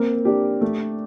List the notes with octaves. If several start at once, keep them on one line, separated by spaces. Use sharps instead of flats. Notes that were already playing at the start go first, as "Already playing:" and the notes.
Already playing: A#3 C4 A#4
D4 G4
A3